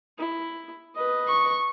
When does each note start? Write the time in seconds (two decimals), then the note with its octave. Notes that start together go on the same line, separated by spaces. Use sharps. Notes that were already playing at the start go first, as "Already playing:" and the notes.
0.18 E4
0.95 B4 D#5
1.29 C#6